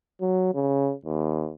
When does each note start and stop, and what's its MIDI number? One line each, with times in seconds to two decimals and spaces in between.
0.21 0.51 54
0.54 0.93 49
1.05 1.52 39